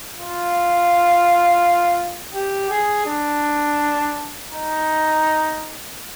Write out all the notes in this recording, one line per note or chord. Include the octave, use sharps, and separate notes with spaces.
F4
G4
G#4
D4
D#4